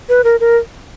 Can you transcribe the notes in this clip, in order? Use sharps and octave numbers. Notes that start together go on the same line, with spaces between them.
B4
A#4
A#4